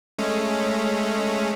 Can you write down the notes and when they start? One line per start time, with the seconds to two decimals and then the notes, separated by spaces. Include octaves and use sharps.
0.18 G#3 A3 C#4